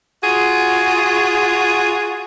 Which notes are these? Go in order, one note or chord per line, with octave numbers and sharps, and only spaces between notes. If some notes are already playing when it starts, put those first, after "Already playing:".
F4 F#4 G#4